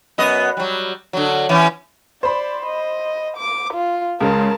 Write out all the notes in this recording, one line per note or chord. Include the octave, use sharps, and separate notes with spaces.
F#2 B3 D#5
F#3 G3
D3 F#3
E3 C#4
C5 D5 B5
D#5
D6
F4
C#2 C#3 G#3 A#4 A5